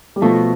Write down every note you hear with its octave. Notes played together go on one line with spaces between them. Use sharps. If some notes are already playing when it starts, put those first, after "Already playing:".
G3
B2 F3 A3